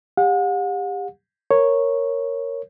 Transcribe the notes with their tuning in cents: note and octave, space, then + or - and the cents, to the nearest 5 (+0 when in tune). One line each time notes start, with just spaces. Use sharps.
G4 +30 F#5 -40
A#4 +0 C#5 -5